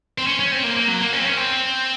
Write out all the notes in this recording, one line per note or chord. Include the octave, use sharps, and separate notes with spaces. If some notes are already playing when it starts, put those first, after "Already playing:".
C4
C#4
C#4
C4
A#3
A#3
F#3
A#3
C#4
C4
C#4
C4